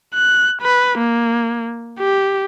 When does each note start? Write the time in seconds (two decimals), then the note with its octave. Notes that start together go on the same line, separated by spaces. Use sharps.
0.14 F#6
0.62 B4
0.99 A#3
1.99 G4